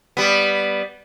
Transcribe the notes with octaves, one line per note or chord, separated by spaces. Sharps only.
G3 B3